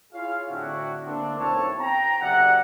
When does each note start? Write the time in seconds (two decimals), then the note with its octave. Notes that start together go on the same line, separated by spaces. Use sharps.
0.12 E4 F4 G#4 C#5 F5
0.48 A2 D3 C4 D4 E4 F#4
1.03 D3 A3 A#3 C4 D4
1.38 B1 C4 E4 A4 C#5 A5
1.79 G5 A#5
2.20 F#1 F#2 C3 D5 E5 F#5